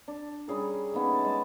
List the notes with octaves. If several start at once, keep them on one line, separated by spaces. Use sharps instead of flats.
D4
G3 C#4 G#4 A#4
D#3 A#3 B3 C#4
A3 A5
G#3 D5